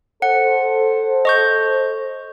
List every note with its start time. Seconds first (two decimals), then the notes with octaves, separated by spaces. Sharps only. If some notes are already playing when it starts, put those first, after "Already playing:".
0.22 A4 C5 F#5
1.25 D#5 C#6 G6